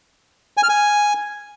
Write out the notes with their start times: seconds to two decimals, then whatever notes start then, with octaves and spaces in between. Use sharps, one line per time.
0.57 G#5
0.63 F6
0.69 G#5